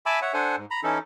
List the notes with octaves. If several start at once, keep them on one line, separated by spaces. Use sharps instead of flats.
E5 G#5 A5 B5 D6 E6
C#5 E5 F#5
D4 A4 C5 F#5 G#5
G#2
A#5 B5
E3 C#4 D#4 E4 A4